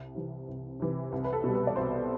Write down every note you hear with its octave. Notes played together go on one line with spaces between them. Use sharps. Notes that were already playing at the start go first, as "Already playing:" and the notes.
Already playing: C2
C3 E3
C2
C3 E3
C2
B4
A4
B2 G3
B4
D5
C2 C5